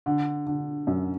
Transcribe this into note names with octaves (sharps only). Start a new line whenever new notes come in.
D3
D3
F#2